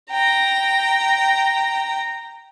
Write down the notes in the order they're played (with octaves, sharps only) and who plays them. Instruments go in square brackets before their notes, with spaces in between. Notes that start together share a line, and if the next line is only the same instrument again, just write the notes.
[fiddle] G5 A#5